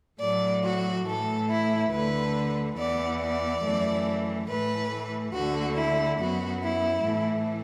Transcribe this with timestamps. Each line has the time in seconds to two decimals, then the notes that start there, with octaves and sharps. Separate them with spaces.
0.19 A2 F#3 A3 D5
0.63 F#4
1.05 A2 E3 A3 A4
1.49 E4
1.91 D2 D3 A3 B4
2.76 E2 E3 B3 D5
3.20 D5
3.62 F#2 E3 A3
4.48 A2 E3 A3 B4
5.33 D2 D3 A3 F#4
5.75 E4
6.18 F#2 F#3 B3 F#4
6.62 E4
7.04 A2 E3 A3